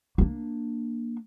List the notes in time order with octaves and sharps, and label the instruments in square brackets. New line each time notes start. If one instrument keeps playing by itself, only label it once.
[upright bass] A#3 D4